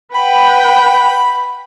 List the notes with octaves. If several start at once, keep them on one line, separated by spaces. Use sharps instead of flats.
B4 F#5 G5 B5